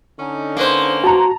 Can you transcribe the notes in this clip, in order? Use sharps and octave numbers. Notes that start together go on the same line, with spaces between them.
D3 C#4 D#4
A#3 B4 C5
F#4 A5 A#5